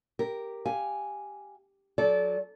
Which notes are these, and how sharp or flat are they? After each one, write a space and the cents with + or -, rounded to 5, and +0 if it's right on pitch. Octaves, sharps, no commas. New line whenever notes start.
G4 +0 A#4 +0
G4 +0 F5 +0 G#5 +0
F#3 -30 A4 -25 D5 -20